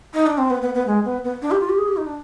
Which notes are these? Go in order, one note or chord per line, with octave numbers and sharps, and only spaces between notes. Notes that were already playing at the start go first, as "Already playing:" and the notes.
D#4
D4
C4
B3
B3
B3
G#3
B3
B3
D4
G4
F4
G4
G#4
G4
D#4
D4